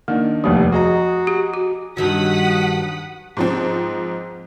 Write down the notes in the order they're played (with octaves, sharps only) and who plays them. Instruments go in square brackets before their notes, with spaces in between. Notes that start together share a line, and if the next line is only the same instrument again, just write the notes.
[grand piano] D#3 D4 [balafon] A#3
[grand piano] F1 D#2 G3 [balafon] F3
[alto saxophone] F#4 [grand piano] G#4 D#5 A#5
[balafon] G4
F#4
[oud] G2 D#3 F#3 [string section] F#5 D#6 B6
[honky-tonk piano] G#2 F3 C4